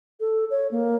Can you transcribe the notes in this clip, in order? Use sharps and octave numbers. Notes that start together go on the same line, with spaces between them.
A4
C#5
A#3